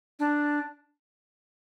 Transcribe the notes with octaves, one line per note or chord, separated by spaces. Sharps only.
D4